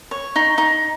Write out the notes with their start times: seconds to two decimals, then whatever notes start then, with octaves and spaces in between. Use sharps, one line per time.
0.11 C#5
0.36 D#4
0.58 D#4